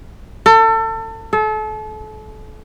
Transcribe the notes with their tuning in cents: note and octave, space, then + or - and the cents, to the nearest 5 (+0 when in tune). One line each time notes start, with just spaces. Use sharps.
A4 +30
A4 -35